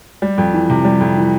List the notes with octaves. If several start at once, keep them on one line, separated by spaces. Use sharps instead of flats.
G3
F2
E3
C3
G3
F2
E3